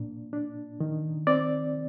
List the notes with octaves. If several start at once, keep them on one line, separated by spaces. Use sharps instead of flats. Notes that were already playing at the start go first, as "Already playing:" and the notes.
Already playing: A#2 D4
D4
D#3
C4 D5